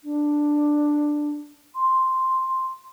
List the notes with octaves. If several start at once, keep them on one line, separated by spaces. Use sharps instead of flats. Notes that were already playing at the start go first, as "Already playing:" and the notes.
D4
C6